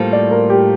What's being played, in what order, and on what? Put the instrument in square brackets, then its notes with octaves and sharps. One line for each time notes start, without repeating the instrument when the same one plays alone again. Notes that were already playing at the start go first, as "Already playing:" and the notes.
Already playing: [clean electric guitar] A2 G3 A#3 F4 A4 [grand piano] C5
[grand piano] D5
A#4
G4